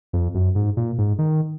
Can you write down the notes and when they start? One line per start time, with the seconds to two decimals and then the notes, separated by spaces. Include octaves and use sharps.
0.13 F2
0.34 F#2
0.55 G#2
0.77 A#2
0.98 G#2
1.19 D#3